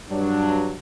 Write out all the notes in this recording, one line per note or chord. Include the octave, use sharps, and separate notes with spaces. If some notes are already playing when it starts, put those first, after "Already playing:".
G2 F#3 D4